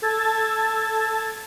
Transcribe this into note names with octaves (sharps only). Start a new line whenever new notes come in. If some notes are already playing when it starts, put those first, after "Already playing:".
A4 A5 E6 G#6 A6